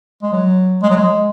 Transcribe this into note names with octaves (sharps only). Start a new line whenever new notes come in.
G#3
F#3
G#3
F#3
G#3